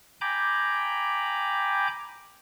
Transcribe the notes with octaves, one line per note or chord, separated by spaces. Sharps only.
G5 G#5 A#5 B5 D6 G6